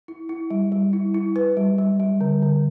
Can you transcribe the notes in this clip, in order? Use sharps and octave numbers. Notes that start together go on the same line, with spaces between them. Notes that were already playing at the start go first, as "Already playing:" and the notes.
E4
E4
G3
G3
E4
E4
B4
G3
G3
G3
D3
D3